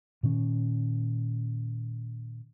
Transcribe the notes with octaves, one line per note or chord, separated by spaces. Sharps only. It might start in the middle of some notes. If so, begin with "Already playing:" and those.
A#2 D#3 C#4